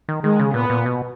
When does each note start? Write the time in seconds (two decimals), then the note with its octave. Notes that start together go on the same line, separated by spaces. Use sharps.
0.09 D#3
0.23 D#3 G#3
0.39 C#3
0.54 A#2 B3
0.70 A#2
0.86 B2